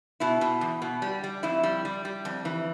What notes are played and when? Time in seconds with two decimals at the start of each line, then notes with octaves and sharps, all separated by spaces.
0.20 B2 E4
0.41 B2
0.61 E2
0.82 B2
1.02 G3
1.24 G3
1.43 F2 E4
1.63 G3
1.85 G3
2.05 G3
2.25 F2
2.45 E3